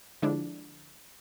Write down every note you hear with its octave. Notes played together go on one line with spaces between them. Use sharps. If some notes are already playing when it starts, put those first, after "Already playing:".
D3 F3 G#3 D4 E4